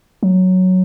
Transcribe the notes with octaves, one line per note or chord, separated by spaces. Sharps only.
F#3